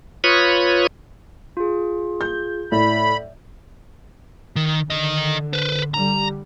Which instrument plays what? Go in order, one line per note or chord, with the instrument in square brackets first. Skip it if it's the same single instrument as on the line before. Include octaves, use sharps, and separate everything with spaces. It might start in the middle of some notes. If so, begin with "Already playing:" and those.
[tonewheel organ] F4 B4 C#5 B5 C#6 D#6
[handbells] F4 G#4
[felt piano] G6
[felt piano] A2 [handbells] D5 [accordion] B5
[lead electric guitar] D#3
[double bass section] D3 [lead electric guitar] D#3 D#5
[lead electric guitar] B4 C5
[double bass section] D3 G3 [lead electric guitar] A#5